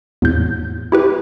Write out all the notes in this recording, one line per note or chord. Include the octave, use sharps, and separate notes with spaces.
E2 A2 G6
E4 G4 B4